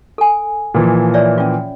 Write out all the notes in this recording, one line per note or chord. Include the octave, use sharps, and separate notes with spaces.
A4 G#5
A#2 E3 F3
C#5 D5 E5
C#4 F4